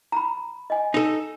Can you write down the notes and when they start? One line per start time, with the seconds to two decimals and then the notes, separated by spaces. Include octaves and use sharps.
0.12 A#5 B5
0.70 D#5 G#5
0.94 D#4 A4